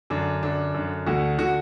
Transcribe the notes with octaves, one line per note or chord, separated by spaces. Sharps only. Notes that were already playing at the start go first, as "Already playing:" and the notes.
F#2 D3 D4
F#2 D3 D4
F#2 D3
D2 D3 F#4
D3 F#4